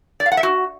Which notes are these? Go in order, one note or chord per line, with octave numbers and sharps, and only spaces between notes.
D5
F5
F#5
E5
F#4